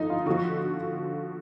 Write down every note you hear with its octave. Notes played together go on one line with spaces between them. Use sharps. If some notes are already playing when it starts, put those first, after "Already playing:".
Already playing: D3 F3 D#4
F4
D3 F3 F#4